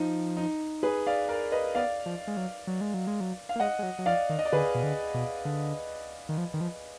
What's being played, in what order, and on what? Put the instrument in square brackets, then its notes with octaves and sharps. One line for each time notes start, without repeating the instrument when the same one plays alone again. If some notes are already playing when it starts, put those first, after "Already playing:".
Already playing: [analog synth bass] F3 [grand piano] D#4
[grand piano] D#4
G#4 B4
D5 F5
A#4 D5
B4 D#5
[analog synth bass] B3 [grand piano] D5 F5
[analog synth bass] F3
G#3
F#3
F#3
G#3
F#3
G#3
F#3
[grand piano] F5
[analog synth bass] A#3
[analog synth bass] G#3 [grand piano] D#5 F#5
[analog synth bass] G#3
F#3
F#3
[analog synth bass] F3 [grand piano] D5 F5
[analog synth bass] D#3
[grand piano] D#5
D5
[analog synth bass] D3 [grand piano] G#4 B4
[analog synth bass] B2
D3
B2
D3
D#3
F3
D#3
F3